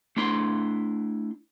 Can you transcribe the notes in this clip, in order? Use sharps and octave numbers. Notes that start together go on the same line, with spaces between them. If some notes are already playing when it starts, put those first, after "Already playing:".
A3 D4 E4 C6